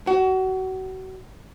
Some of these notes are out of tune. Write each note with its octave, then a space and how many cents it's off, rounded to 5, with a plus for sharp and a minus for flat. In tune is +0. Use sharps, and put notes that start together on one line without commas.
F#4 +30